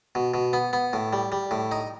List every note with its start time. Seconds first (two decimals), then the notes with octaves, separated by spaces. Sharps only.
0.15 B2
0.34 B2
0.53 B3
0.73 B3
0.93 A2
1.13 G3
1.32 G3
1.51 A2
1.72 D#4